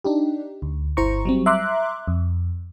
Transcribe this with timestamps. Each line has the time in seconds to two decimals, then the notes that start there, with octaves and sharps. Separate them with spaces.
0.04 D4 D#4 G4
0.62 D2
0.97 G1 E4 C5 A#5 C#6
1.25 F#3 G3 C4
1.46 E5 A#5 C6 D6 F#6
2.08 F2